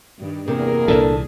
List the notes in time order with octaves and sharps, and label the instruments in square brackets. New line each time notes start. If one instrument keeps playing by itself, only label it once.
[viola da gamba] G2 D#3 G3
[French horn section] E2 A#4 [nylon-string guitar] C3 [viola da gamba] A#3 G#4
[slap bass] C2 A#2 E3 [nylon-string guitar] D4 A4